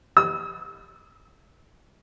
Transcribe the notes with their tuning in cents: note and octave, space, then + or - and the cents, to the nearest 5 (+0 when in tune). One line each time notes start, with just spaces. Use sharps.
E6 -45